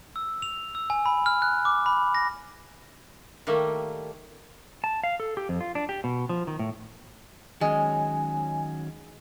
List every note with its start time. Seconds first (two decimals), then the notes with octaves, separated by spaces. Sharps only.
0.16 E6
0.42 F7
0.75 E6
0.90 G#5
1.06 B5
1.26 F6
1.42 F#6
1.65 D6
1.86 B5
2.15 A#6
3.47 D#3 G3 A3 A#3
4.84 A5
5.04 F5
5.20 A4
5.37 G4
5.49 F2
5.61 F4
5.75 D4
5.89 G4
6.04 B2
6.29 F3
6.47 D#3
6.59 A2
7.61 D#3 F#3 G#3 C#4 G#5